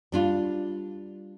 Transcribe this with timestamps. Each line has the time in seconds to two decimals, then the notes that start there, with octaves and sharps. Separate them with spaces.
0.12 G3 D4 F4